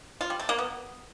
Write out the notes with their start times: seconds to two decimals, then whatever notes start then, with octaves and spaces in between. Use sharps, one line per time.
0.21 F4
0.30 G3
0.39 A3
0.49 A#3
0.58 B3